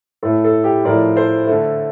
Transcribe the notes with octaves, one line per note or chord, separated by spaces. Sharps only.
A2 A3 A4
A4
G4
A2 F3 A3 A#4 D5
A4 C5
D3 A3